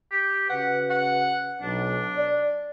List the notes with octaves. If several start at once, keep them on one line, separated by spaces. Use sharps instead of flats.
G4
C#3 F#4 B4 F#5
F#5
B1 D4
D5